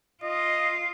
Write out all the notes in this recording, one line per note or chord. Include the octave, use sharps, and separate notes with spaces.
F4 D#5